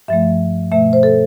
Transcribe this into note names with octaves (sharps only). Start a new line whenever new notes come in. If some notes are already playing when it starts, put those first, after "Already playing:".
G2 F3 A3 E5
B2 A3 E5
C5
A4